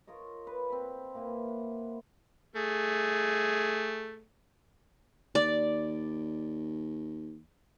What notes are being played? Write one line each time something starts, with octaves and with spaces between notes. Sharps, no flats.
F4 A#4 C#5 D#5
B4
C4 B5
A#2 A#3 E4 B4
F#5
A3 G#4
D#2 D5